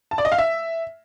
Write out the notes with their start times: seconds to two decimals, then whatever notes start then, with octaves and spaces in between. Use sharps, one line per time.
0.11 A5
0.18 D5
0.25 D#5
0.32 F5
0.38 E5